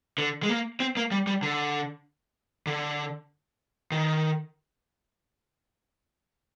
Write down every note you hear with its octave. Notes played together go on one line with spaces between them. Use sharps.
D3
G#3
A#3
C4
A#3
G3
G3
D3
D3
D#3